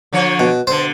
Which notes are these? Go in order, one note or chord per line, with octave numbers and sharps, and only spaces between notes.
D3 F3 C#5
B2
B2 D3 C5